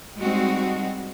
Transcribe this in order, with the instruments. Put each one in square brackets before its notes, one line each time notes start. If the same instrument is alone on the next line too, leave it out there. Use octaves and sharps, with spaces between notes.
[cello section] G3 G#3 C4 D#4 F#4